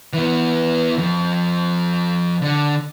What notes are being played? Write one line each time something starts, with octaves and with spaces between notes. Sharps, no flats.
E3 B3
F2 F3
D3